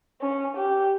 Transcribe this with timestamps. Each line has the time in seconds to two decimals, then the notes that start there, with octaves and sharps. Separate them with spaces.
0.21 C#4
0.57 G4